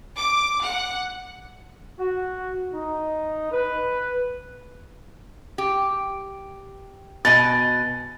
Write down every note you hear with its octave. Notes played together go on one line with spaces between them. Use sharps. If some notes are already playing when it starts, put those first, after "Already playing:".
D6
F#5
F#4
D#4
B4
G4
B2 D#5 G#5 A6